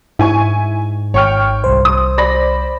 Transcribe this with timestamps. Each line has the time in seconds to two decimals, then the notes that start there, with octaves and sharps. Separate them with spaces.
0.19 G#2 E4 G#5 C#6
1.14 G#1 C#5 G5 C#6 F6
1.64 C2 C5
1.85 D#6
2.18 D5 B5 A#6